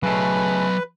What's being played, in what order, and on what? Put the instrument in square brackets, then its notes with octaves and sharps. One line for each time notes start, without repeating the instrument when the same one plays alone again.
[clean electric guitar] C#3 A3 [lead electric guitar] F#3 D#5 [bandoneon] B4